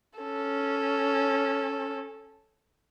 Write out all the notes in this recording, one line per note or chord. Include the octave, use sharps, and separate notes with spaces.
C#4 A4